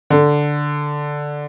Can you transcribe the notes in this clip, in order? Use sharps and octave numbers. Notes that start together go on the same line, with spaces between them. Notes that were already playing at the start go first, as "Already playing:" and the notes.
D3